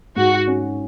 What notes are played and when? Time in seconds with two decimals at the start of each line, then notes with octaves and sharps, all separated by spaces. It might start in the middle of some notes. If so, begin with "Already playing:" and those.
0.16 G#2 F#4
0.47 C#4